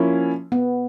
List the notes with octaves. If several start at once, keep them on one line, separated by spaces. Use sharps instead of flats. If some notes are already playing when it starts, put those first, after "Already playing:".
Already playing: F3 A#3 C#4 E4
B3